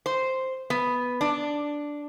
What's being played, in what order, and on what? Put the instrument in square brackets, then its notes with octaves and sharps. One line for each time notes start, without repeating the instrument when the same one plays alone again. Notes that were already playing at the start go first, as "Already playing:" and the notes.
[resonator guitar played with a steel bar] C5
B3
D4